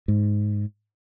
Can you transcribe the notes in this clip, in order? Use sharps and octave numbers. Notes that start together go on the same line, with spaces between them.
G#2